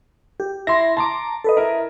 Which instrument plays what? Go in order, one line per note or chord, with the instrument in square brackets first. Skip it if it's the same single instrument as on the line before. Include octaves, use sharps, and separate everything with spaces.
[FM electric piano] G4
[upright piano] E4 [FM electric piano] C6 A#6
[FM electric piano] A5 A#5 D6 [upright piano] C6
[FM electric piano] A4 B4 D#5
[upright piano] E4 A#4